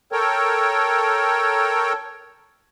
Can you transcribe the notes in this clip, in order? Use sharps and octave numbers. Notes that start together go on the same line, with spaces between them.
A4 A#4 C#5 G5